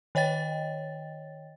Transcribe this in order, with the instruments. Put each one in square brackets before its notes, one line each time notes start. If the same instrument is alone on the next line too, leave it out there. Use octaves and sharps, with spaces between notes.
[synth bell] D#3 C#5 D#5 G5 A6